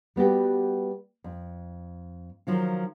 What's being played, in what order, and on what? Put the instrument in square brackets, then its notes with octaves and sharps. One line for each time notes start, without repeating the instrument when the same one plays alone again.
[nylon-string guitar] G3 B3 F#4 G4
F2
D#3 F3 F#3 F4